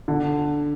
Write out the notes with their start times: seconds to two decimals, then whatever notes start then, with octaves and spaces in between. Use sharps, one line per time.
0.08 D3